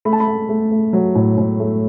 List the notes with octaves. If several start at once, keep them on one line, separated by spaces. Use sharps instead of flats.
A3 B5
A5
B5
A3
A3
A3
F#3
A2
A2
A3